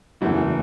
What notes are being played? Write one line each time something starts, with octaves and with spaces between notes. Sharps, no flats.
F#1 E2 C#3 E3 F#3 A3